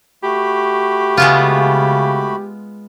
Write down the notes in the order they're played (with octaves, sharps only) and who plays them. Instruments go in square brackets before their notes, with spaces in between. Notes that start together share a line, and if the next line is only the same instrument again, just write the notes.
[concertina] A3 F#4 B5 [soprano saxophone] G4
[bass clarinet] C#3 [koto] G#3 B3 F4